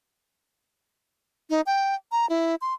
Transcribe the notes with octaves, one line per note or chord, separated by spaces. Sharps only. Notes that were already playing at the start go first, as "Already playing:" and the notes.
D#4
G5
A#5
E4
C6